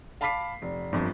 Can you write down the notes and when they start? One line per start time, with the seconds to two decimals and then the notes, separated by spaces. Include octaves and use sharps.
0.21 F5 A5 B5 D6 B6 C7
0.62 F1
0.93 G1 F2